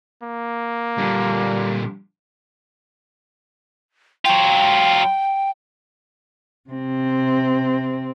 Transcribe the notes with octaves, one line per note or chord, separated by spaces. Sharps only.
A#3
A#2 D3 G3
F#3 F4 G5
C3 C4